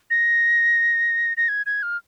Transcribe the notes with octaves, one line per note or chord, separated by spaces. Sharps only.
A#6
A#6
G#6
G#6
F6